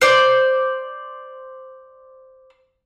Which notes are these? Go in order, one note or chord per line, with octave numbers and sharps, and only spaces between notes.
C5 D5